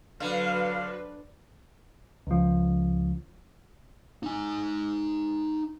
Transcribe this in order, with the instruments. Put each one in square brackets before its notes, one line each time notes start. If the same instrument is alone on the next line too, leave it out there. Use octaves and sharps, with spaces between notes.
[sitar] D3 [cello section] F#3 F#4 C5 [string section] B4 [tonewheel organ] F5
[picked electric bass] C#2 F3
[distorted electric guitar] D#4 G#5